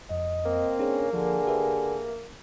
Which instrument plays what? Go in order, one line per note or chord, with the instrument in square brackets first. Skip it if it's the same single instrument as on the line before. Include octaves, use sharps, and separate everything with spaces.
[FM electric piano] F2 [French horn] D#5
[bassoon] A#3 [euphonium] C4
[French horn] C#4 [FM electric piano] D4 G#4
[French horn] D3 [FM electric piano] F3 [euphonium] G#4
[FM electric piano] G4 B4 E5